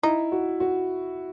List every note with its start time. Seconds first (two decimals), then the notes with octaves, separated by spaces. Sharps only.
0.03 D#4 E4
0.32 F#4
0.60 F#4